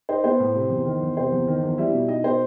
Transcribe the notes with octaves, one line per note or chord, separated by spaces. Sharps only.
D#4 C5
B3 C5
A2
C3
E2
D#3
E2
C3 C5
E2
D#3
E2
G3 E4 E5
B2
D#4 D#5
B2 C5